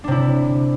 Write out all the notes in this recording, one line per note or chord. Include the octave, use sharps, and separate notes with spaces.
C3 D4 E4